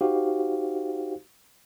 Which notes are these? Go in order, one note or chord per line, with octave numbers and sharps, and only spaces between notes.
D#4 F#4 G4 C5 F5